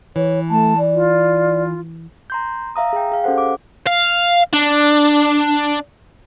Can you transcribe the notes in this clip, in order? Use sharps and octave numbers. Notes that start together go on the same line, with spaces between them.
E3 C#5
A3 A5
D5
F4
A#5 C6 G6
E5 F5 A#5 D#6
G#4 G5
G#4 F5
C#4 G4 A4 C5 F#5
D6
F5
D4